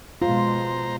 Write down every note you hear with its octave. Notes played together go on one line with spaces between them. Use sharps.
B2 G#3 F4 C5 A#5